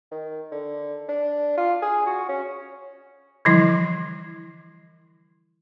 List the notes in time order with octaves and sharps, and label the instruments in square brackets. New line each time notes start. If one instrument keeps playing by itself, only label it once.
[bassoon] D#3
D3
D4
F4
G#4
F#4
C#4
[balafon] D3 E3 F3 G3 E4